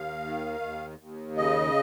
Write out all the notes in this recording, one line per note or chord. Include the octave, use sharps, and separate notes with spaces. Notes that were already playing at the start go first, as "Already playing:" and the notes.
Already playing: D#2 F5
D#3
D#2
D#2
C#3 D#5